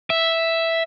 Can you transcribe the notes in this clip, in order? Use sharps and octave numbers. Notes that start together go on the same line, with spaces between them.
E5